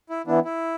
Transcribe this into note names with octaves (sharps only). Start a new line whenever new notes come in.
E4
E3 B3 D4 E4
E4